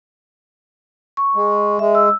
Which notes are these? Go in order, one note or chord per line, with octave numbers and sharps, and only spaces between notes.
C#6
G#3
G#3 E5
E6